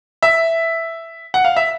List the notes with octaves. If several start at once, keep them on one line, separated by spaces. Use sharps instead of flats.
E5
F#5
F5
E5